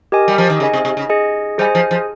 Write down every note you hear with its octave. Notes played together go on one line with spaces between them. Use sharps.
G4 A#4 D#5 G#5
G3
F3
D#3
C#3 G#4 D#5 G#5
C3
C3
C#3
G#4 D#5 G#5
G3 G#4 C5 D#5 G#5
F3
F3